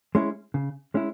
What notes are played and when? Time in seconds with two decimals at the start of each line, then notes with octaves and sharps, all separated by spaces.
0.15 G#3 C#4 E4
0.54 C#3
0.94 G#3 C#4 E4